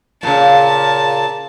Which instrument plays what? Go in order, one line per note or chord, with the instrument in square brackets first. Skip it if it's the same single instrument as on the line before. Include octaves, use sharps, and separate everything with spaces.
[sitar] A#2 C#3 [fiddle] A5